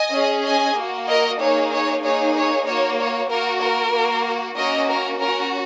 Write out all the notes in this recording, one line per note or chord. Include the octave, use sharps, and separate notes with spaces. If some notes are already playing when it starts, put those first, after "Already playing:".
Already playing: D#5 G#5
C#4 G#4
D#5 G#5
A#3 F#4
A#4 D#5
A#3 D#4 G#4 C#5
C#5
A#3 D#4 G#4 C#5
C#5
A#3 F#4 C#5
C#5
A#3 F#4 A#4
A#4
A#3 F#4
A#3 C#4 F#4 A#4 D#5
A#4
C#4 F#4 A#4